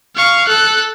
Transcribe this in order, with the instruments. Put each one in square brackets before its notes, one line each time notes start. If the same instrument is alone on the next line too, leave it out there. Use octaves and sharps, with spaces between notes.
[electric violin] F5 C#6
A4 F#6